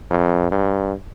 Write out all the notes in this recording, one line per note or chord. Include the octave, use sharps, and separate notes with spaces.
F2
G2